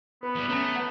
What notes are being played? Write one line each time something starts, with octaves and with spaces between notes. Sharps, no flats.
B3 B4
E2 G3
A3 C#4 A#5
B4 F#5